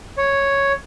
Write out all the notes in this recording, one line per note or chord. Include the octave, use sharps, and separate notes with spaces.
C#5